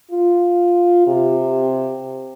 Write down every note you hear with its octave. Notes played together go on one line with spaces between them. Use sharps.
F4
C3